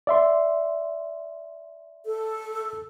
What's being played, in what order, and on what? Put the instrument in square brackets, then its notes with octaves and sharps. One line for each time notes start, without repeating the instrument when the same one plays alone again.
[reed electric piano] D5 E5 C6
[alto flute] A4